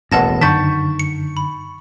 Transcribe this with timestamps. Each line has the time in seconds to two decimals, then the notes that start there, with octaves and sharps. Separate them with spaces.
0.12 E1 A1 F2 B3 F#5 A5 A#6
0.41 F#2 D3 D#3 A5 C#6 G6 A6 B6
0.99 C#7
1.37 B5